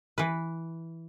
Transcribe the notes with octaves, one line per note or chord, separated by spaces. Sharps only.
E3 B4